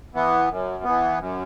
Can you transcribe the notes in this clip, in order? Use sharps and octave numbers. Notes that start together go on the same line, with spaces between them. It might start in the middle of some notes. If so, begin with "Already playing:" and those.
E3 B3
F#2
E3 B3
F#2